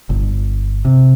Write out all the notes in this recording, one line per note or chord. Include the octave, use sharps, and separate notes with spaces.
G1
C3